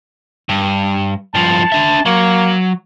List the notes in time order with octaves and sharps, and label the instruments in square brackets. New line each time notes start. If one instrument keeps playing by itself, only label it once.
[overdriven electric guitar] G2
[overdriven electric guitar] G2 F3 [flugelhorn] A5
[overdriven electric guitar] D4 E5
[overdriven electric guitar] F#3 [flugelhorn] A#3